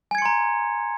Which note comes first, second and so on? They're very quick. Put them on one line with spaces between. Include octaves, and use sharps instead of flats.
G#5 G#6 C#7 C6 A#5